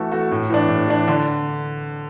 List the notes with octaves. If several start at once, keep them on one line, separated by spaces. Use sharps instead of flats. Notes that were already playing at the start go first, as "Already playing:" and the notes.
Already playing: E3 A3 F#4 A4
A3 F#4 A4
A2
E3 D4
A2
E3 D4
D3